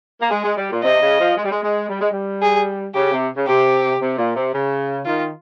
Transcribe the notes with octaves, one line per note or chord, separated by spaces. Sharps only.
A#3
G#3 G#4
G#3
G3
A#2
C3 D#5
C#3
F3
G#3
G3
G#3
G#3
G3
G#3
G3
G#4
C#3 G4
C3
C#3
C3 G4
C3
A#2
C3
C#3
D#3 F4